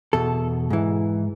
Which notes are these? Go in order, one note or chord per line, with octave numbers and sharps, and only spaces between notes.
E2 B2 A4
G#2 E3